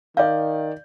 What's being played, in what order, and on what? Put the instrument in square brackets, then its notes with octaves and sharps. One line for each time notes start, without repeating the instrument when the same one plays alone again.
[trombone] D#3 [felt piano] D5 G6 [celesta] F5